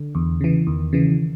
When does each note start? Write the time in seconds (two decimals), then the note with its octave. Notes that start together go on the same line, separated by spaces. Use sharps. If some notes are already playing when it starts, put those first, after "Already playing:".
Already playing: D3
0.15 E2
0.41 C#3 E3
0.67 E2 D#3
0.93 C#3 E3